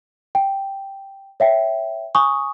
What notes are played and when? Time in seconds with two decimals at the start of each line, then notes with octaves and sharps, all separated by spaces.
0.35 G5
1.40 C#5 E5 G5
2.15 G#5 C#6 D#6